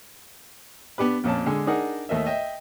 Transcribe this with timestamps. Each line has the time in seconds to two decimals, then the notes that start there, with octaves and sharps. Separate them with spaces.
0.98 B3 D4 G4 B4
1.24 F2 A#2 C#4 A5
1.46 D3 G#3
1.67 D4 D#4 G#4 A#4 F#5
2.09 D#2 A3 A#4 D#5 E5
2.26 D#5 E5 G5